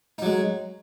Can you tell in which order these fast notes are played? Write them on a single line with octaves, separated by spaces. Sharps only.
D#4 F#3 G#3